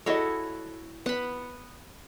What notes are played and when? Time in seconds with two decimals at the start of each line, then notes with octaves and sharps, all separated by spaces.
0.06 E4 F#4 G#4 A4 C#5 D#5
1.06 B3 F#5 B5